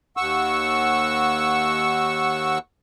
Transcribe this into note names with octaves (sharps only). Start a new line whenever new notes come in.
D#2 F#5 C#6 E6